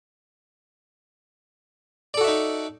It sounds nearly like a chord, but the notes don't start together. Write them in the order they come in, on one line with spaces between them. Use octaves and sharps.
D5 A4 F#4 E5 D#4